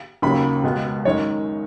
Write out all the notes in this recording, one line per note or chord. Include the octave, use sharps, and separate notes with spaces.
D#2 C#3 F#3 B5
C#2 B2 G#3 B3
F#2 D#3 G#3 C#5